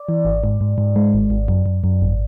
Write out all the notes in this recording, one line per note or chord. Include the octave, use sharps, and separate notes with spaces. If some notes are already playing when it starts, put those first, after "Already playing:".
Already playing: D5
E3
G#1
G#2
G#2
G#2
G#3
G#1
G#1
F#2
F#2
F#2
G#1